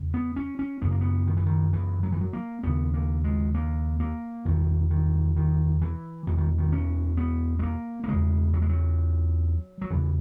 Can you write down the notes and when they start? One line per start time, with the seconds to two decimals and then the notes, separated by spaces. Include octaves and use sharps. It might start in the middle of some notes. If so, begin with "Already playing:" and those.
Already playing: E2 C#3
0.14 B3
0.36 C#4
0.59 C#4
0.82 F#2 C#3 B3
0.91 A#3
1.01 B3
1.27 D#3
1.37 E3
1.46 D#3
1.73 E3
2.03 F#3
2.12 E3
2.21 F#3
2.33 A#3
2.63 D#2 C#3 B3
2.94 A#3
3.24 G#3
3.55 A#3
4.00 A#3
4.45 E2 B2 D#3
4.90 D#3
5.36 D#3
5.82 E3
6.26 E2 B2 E3
6.38 D#3
6.58 D#3
6.72 C#4
7.17 B3
7.59 G#3
7.63 A#3
8.04 A#3
8.08 E2 C#3 G#3
8.54 F#3
8.62 G#3
8.69 F#3
9.81 F#3
9.90 E2 C#3 E3